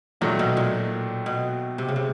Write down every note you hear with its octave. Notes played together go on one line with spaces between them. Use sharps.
D#2 A#2 D#3 F#3 A3
B2
A#2
B2
C3
C#3
C3